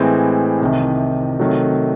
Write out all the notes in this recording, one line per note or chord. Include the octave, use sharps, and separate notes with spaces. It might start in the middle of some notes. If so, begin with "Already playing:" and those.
Already playing: A2 E3 G#3 C4
C2 C3 D#3
C3 D#3 F#3 A3